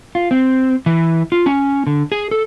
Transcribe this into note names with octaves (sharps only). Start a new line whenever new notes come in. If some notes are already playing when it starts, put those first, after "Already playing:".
F4
C4
E3
F4
C#4
D3
G#4
A4